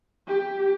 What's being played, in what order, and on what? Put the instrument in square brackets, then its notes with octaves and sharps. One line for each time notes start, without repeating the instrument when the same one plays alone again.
[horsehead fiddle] G4